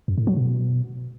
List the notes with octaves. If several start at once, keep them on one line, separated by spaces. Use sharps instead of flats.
F#2
A2
F#3
B2